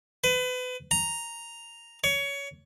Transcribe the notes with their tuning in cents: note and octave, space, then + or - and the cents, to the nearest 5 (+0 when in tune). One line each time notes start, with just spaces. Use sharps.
B4 +30
A#5 +0
C#5 +20